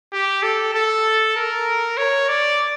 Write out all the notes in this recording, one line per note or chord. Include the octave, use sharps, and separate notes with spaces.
G4
A4
A4
A#4
C#5
D5